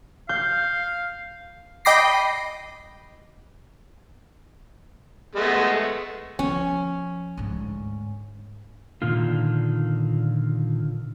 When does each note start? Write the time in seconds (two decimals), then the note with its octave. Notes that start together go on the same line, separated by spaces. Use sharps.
0.29 F5 G6
1.85 D#5 G5 B5 D6 A#6 C7
5.36 G#3 A3 B3
6.39 F3 C#4
7.37 D2 G#2
9.02 A#2 D3 D#3 A#3 F4